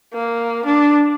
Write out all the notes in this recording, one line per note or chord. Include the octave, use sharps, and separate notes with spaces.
A#3
D4